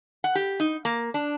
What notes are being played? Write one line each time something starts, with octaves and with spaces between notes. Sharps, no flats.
F#5
G4
D#4
A#3
D4